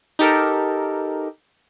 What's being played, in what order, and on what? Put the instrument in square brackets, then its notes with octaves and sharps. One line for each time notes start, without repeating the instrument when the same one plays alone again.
[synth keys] D#4 G4 A4 A#4